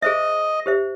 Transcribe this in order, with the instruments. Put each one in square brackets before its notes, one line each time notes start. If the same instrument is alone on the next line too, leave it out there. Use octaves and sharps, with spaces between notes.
[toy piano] G#4 C5 E5 [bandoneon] D#5
[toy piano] G4 C5 E5